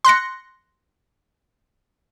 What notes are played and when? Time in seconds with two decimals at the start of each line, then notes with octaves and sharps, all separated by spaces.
0.05 C6 F#6 A#6 C#7